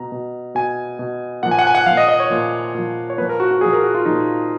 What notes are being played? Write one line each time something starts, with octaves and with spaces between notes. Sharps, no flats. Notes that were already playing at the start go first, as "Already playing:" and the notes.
Already playing: B2 A#5
B2
B2 G#5
B2
A#2 F3 F#5
G#5
F#5
G#5
F#5
A#2 F3 F5
D#5
D#5
C#5
A#2 F3
A#2 F3
C#5
A#2 F3 B4
A#4
F#4
F#4
A#2 F3 G#4
A#4
F#4
F4
A#2 F3 D#4